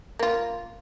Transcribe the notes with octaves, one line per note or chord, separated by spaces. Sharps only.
A#3 F4